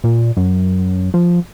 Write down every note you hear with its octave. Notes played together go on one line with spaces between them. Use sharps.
A#2
F#2
F3